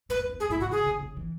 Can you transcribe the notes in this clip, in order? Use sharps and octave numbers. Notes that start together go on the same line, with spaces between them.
G#2 B4
F#2
E2
F#2 G#4
G#2 E4
C#3 F#4
C#3 G#4
C#3
C#3
E3